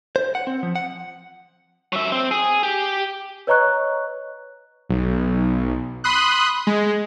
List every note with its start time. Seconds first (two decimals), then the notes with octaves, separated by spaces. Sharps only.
0.16 C5
0.35 F#5
0.47 C4
0.63 F3
0.76 F#5
1.93 F#3 E5
2.12 C4
2.31 G#4
2.63 G4
3.47 B4 C#5 D#5 A#5 C#6 F#6
4.90 B1
6.04 B5 C6 D#6 F#6
6.67 G#3